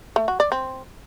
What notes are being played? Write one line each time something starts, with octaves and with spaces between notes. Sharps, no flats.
A3
F#4
D5
C4